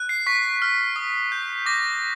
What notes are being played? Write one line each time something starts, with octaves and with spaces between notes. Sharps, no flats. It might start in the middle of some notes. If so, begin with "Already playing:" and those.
Already playing: F#6
C7
C#6 B6
F6
D#6
G6
D6 A#6